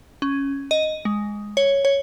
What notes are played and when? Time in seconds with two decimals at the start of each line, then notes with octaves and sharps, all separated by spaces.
0.22 C#4
0.71 D#5
1.05 G#3
1.57 C#5
1.85 C#5